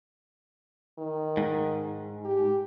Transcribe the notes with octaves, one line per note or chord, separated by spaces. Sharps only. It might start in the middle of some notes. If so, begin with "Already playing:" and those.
D#3
G#2
G4